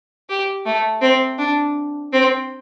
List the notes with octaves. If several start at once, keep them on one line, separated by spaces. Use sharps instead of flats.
G4
A3
C4
D4
C4